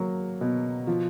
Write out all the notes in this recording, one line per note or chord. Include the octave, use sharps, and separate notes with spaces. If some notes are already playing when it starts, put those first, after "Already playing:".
Already playing: F#3 A#3
B2
F3